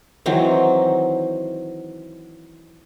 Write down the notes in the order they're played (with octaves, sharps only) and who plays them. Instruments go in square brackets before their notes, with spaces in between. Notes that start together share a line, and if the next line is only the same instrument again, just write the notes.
[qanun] D#3 E3 F#3 C4